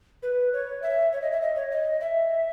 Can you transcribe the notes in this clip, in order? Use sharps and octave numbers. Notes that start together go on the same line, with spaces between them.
B4
C#5
E5
C#5
D#5
E5
D#5
C#5
D#5
E5